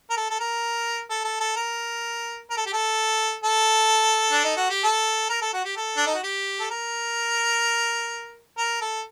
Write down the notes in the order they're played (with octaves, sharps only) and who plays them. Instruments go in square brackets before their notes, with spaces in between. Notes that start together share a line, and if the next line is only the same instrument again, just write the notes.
[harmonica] A#4
A4
A4
A#4
A4
A4
A4
A#4
A#4
A4
G4
A4
A4
D4
D#4
F#4
G4
A4
A#4
A4
F#4
G4
A4
D4
D#4
F#4
G4
A4
A#4
A#4
A4